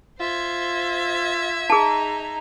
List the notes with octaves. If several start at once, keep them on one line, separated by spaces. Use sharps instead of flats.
F4 C5 E5 G#6
D#4 G#4 A5 A#5